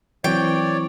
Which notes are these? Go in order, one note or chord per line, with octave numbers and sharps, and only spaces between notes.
E3 F#3 C4 C#5 D5 G5